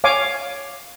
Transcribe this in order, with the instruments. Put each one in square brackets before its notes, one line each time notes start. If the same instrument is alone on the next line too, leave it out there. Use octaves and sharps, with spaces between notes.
[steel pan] C#5 F5 G#5 D6